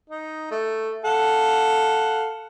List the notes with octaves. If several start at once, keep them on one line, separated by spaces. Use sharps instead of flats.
D#4
A3
A4 F5 F#5